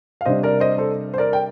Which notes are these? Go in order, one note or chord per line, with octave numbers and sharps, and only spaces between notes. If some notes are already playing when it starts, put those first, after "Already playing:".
F5
C3 G3 D4 C5 D#5
A#4 D5
C5 D#5
A4 C5
C5
A#4 D5
G5